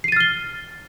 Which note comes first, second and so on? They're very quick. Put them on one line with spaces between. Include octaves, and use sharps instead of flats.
C7 D#7 A6 F6 G7